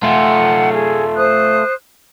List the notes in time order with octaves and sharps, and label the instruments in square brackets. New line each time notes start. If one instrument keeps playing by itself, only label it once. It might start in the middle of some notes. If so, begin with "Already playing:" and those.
[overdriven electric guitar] A3 F4 [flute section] F#5 G#5
[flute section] G#4
C5 D#6 F#6